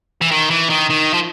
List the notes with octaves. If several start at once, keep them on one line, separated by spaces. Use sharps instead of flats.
E3
D#3
E3
D#3
D#3
F3